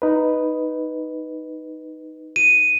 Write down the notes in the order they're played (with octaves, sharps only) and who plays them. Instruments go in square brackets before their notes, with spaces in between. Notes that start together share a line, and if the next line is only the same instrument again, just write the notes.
[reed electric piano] D#4 B4
[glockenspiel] D#7